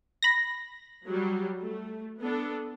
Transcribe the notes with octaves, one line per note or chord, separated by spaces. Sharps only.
B5 A#6
F#3 G3
A3
B3 D4 A4